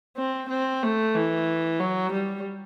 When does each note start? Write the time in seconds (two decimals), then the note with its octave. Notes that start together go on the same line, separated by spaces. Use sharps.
0.17 C4
0.50 C4
0.83 A3
1.15 E3
1.80 F#3
2.13 G3